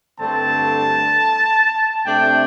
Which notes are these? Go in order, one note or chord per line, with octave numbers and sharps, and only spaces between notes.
G2 D3 A3 C4 A5
C3 A3 D4 G5